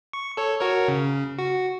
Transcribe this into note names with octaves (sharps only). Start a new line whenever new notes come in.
C#6
A4 C#5
F#4 A#4 C#5
C#3
F#4